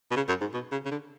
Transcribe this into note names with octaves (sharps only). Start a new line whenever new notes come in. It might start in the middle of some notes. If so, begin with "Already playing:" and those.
B2
C#3
F#2
G#2
B2
C#3
C#3
D3